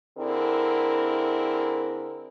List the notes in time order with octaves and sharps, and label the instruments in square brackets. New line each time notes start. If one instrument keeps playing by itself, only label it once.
[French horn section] D3 C4 E4 G#4 A#4